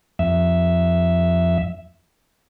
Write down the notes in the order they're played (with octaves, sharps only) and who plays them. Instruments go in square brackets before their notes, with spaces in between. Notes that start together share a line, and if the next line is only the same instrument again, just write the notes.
[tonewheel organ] F2 E5